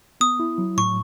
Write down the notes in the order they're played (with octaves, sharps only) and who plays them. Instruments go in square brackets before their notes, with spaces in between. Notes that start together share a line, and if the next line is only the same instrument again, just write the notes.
[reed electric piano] B3 [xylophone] D#6
[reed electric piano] E4
F#3
[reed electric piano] A2 [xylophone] C#6